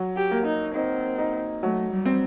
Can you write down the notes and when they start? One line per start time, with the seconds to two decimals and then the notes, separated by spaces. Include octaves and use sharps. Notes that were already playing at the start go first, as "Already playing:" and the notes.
Already playing: F#3
0.16 G4
0.31 A#3
0.45 D#4
0.74 C4 D#4
1.18 D#4
1.62 F#3 A3
1.91 G3
2.05 C4